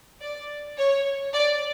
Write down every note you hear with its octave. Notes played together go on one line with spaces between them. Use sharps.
D5
C#5
D5